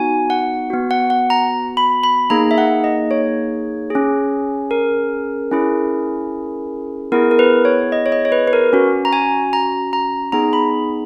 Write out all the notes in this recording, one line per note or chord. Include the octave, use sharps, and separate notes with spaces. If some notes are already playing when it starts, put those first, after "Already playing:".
Already playing: B3 D#4 F#4 G#5
F#5
B3 F#4
F#5
F#5
A#5
B5
B5
A#3 D#4 G#4 A#5
E5
F#5
D#5
C#5
C#4 G#4
A#4
C#4 E4 G#4
B3 E4 G#4 A#4
A#4
B4
C#5
D#5
C#5
D#5
C#5
B4
B4
A#4
C#4 F#4
A#5
G#5
A#5
A#5
B3 D#4 G#4 A#5
B5